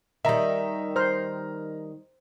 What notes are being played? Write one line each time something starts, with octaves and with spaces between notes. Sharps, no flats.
D#3 G3 E5 A#5
C5 A#5 F6